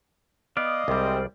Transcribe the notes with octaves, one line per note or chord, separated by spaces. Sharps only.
B3 D5 D#5 F5
C2 C3 G3 G#3 C4